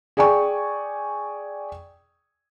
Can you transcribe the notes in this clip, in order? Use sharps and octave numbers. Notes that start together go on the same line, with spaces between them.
G#4 D5 G5 G#5 C#6